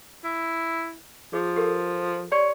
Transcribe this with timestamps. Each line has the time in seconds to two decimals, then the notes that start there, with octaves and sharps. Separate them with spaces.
0.24 E4
1.33 F3 G#4
1.56 G4 A4 A#4
2.32 G4 C#5 D5 C6